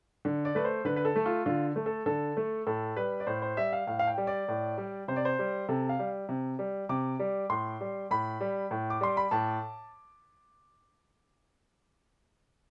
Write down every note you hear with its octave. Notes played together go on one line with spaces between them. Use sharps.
D3
D5
A3 B4
C5
D3 B4
B4
A4
A3
F4
D3 F4
A3
A4
D3 A4
A3
A2 A4
G3 B4
D5
A2 C5
C5
G3 E5
F5
A2 F5
F5
G5
G3
D5
A2
G3
C3 C5
D5
C5
G3
C3 A4
F5
G3
C3
G3
C3 D6
G3
A2 C6
G3
A2 B5
G3
A2
D6
G3 C6
B5
A2 A5